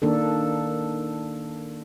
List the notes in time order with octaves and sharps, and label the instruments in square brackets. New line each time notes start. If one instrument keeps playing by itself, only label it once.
[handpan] D#3 A#3 D4 A4